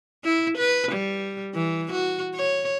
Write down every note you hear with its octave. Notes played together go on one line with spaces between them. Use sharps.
E4
B4
G3
E3
F#4
C#5